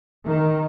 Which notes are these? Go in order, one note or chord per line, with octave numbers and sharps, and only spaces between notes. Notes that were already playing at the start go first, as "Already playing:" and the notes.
D#3